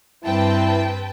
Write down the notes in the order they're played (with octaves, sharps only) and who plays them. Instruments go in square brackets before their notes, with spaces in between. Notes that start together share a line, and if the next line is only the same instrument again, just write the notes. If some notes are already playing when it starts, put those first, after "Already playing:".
[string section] G2 C4 [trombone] E4 [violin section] B4 G5 A5